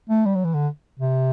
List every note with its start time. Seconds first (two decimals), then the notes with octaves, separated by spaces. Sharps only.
0.09 A3
0.26 G3
0.35 F#3
0.45 E3
0.54 D3
0.99 C3